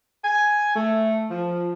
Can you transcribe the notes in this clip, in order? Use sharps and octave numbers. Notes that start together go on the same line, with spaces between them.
G#5
A3
F3